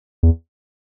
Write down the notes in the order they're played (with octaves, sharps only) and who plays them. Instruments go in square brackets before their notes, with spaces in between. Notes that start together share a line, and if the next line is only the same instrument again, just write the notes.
[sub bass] E2